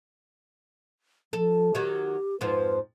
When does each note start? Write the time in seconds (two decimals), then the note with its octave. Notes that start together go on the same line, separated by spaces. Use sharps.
1.33 F3 A4
1.75 D#3 F#3 G4
2.41 F2 G#2 F3 B4